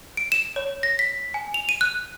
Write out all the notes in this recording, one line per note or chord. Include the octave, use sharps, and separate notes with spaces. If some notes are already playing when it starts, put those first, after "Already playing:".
D7
E7
C#5
A#6
B6
G#5
F7
D#7
F#6